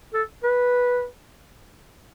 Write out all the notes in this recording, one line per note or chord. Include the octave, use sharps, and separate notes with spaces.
A4
B4